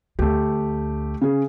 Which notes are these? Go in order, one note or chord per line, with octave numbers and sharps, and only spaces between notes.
D2 A3 G4
C#3 G#4